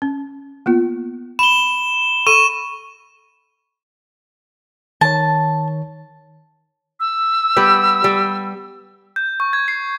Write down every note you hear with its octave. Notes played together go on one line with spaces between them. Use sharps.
C#4
A#3 B3 F4
B5 E7 G7
A4 C#6 D#7 E7
D#3 C#5 A5
E6
G3 B3 G4
G3
G6
C#6
G#6
C7